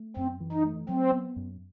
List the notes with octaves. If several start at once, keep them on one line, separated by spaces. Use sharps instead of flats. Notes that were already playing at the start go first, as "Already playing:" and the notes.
Already playing: A3
F#2 C4
E3
D#4
A3
F#3 C4
B3
F#2